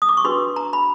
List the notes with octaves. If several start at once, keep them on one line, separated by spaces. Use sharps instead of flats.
D#6
D6
C#6
D4 F#4 B4 C6
A#5
B5